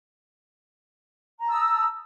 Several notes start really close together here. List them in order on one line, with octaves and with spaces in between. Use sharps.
A#5 A5 E6 D#6